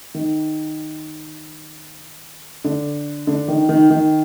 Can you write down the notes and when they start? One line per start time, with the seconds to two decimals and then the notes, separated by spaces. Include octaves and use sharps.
0.14 D#3
2.64 D3
3.27 D3
3.48 D#3
3.69 D#3
3.90 D#3